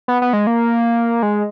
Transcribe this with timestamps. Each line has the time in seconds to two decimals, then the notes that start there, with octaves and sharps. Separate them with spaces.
0.08 B3
0.22 B3
0.33 G#3
0.47 A#3
1.23 G#3